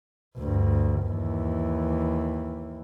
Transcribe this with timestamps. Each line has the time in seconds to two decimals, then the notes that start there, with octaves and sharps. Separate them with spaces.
0.38 D2 G2
1.05 D#2 E3